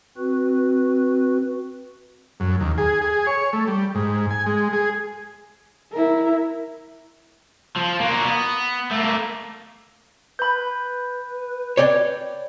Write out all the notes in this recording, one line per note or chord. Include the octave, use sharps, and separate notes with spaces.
C4 F#4 B4
F#2
D#2
G#4
G#4
C#5
A3
G3
G#2
G#5
G#3
G#4
E4 A#4
F3
A#3 F#4
B3
A3 A#3
B4 B5 G6
C#5 D5 G5